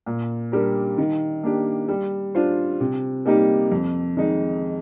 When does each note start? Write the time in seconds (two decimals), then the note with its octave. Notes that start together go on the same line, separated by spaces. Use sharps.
0.06 A#2
0.52 G3 D4 G4 A#4
0.98 D#3
1.43 A#3 D4 G4
1.88 G3
2.35 D4 F4 C5
2.80 C3
3.26 G3 A#3 D#4 G4
3.72 F2
4.17 D#3 G#3 D#4